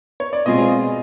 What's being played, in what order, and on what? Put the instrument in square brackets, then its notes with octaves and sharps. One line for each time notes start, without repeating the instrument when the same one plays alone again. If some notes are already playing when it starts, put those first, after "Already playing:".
[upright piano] C#5
D5
[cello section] B2 G#3 C4 F4 G#4 [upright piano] D#5